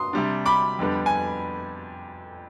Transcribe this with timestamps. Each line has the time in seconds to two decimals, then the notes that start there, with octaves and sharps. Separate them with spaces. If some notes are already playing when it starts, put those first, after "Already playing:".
Already playing: C6 D#6
0.13 C3 G3 D4
0.46 B5 D6
0.79 F2 D3 G3 B3 D4
1.06 G#5